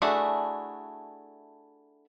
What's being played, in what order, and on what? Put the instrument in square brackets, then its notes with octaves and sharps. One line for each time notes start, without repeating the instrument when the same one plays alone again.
[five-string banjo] A3 D4 E4 F#4 G#4